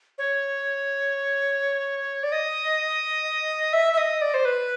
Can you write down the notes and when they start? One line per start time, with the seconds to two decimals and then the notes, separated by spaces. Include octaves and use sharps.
0.18 C#5
2.23 D5
2.32 D#5
3.73 E5
3.93 E5
3.97 D#5
4.22 D5
4.34 C5
4.45 B4